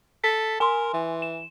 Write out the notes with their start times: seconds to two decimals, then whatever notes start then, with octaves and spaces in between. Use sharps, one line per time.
0.24 A4 B6
0.60 A#4 G#5 C6
0.93 E3
1.22 E7